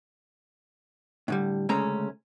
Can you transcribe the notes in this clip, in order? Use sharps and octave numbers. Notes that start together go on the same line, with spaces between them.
A2 D3 G3
D2 C#3 G#3 A3 C#4 A#5